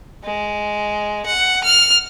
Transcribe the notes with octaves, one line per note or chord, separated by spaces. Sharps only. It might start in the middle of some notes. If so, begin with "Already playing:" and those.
G#3
F#5
F6